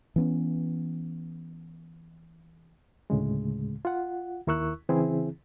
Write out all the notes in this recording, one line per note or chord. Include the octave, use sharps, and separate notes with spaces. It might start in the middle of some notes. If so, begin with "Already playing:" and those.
E3 B3 C#4
D2 A2 C#3 G#3
F4 F#5
D#2 E4 A#4 C#6 E6 F#6
C#3 E3 C4 E4 G#4